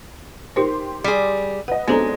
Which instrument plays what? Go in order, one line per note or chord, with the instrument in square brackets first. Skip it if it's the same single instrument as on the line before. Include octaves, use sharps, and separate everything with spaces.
[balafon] D#4 A#4 C5 [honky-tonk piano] G4 C6
[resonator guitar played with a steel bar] G3 G#4
[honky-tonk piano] B4 D#5 [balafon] F#5
[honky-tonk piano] B1 C4 D4 [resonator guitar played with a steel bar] G#3 [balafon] B3 A4 A#5